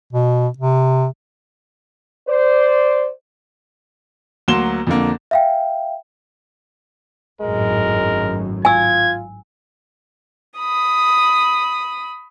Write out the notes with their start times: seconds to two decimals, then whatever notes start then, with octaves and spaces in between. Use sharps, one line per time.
0.13 B2
0.58 C3
2.27 C5 D5
4.48 D2 F#3 A#3 C6 E7 G7
4.87 F2 D3 A#3
5.31 E5 F5 G5
7.41 G#1 F#2 A2 G#3 A#4
8.65 F4 G#5 E6 G#6
10.58 B5 D#6